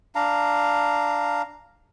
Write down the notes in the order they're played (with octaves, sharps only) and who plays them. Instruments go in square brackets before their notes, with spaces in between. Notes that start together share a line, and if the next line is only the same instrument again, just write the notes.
[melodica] D4 F5 A#5